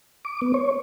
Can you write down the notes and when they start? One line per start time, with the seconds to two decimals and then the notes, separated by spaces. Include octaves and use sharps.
0.25 D6
0.42 B3
0.54 C#5